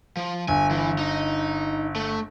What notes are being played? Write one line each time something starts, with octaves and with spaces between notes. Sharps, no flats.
F3
G1 G#5
E3
D#4
A3